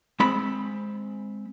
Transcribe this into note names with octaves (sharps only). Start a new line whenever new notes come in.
G#3 C4 B5